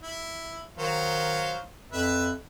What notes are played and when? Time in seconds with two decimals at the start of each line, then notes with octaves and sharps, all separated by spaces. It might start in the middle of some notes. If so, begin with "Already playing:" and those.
0.02 E4
0.77 D#3 F#3 C5 F5
1.92 F2 B4 E5